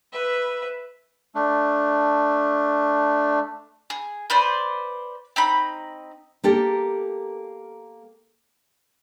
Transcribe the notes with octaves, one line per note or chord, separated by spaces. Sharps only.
B4 E5
A3 D4
G#4
B4 C5 D5
C4 D#4 B5
A#3 G4 A4 A#4